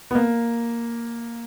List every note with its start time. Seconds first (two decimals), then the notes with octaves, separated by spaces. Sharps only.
0.11 B3
0.15 A#3